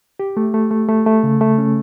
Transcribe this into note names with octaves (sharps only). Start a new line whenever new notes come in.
G4
A3
A3
A3
A3
A3
C#3
A3
C#4